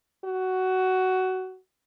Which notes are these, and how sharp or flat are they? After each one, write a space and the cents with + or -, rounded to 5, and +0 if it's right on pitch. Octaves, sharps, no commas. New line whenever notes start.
F#4 +15